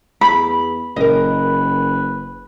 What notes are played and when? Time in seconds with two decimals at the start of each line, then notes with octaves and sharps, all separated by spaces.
0.21 E2 B5
0.96 F#1 A#4 B4 D#5